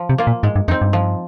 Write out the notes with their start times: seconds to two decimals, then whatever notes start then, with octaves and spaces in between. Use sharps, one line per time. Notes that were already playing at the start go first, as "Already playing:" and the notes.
Already playing: F3
0.09 C3
0.18 A#3 F4
0.27 A#2
0.43 G#2 G#3
0.56 G2
0.68 F2 C4 D#4
0.82 G2
0.93 F3